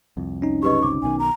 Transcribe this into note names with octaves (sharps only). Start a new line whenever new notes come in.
C2 F2
C#4 D#4
C2 F#2 C#3 G4 B4 D#5 C#6
G1 C#2 C3 D6
B1 B2 D#3 G#5
A#5